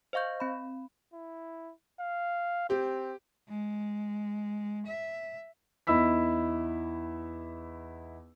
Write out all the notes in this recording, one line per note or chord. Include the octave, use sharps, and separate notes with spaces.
C5 D#5 F5 C#6 G6
C4 B5
E4
F5
C4 G4
G#3
E5
E2 D#4 E4 B5 E6 B6